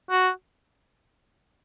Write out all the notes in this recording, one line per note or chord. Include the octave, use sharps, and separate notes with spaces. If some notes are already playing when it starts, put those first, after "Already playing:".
F#4